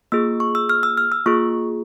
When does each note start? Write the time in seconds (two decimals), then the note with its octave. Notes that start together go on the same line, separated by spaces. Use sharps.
0.12 A#3 F4 G#4 E6
0.40 C#6
0.55 E6
0.69 F6
0.83 E6
0.97 F6
1.12 E6
1.26 A#3 F4 G#4 C#6